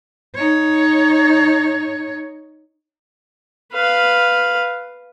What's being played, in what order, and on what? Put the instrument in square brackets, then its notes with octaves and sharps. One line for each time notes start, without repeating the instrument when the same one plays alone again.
[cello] D#4 C#5
[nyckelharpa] B4 F5